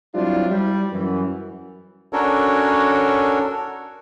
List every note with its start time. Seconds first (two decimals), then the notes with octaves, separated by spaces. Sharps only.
0.14 F#3 G3 C4 D4 E4 F4
0.50 G3
0.92 F#2 E3 F#4
2.13 C#4 D4 F#4 A4 A#4 C#5